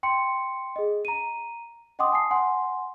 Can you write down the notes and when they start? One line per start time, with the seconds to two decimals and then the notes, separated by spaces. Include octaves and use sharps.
0.03 G5 C6 C#7
0.76 G#4 D#5
1.05 A#5 D#7
1.99 D#5 F#5 G5 C6 D6 D#6
2.12 G#5 A5 D#6 C7
2.31 F#5 G#5 C6